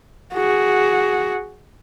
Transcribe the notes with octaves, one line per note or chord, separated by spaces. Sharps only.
F#4 G#4